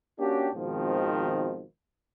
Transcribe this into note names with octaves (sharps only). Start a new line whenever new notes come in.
A#3 C#4 D4 F#4 G4
G#1 G#2 B2 D#3 F3 C4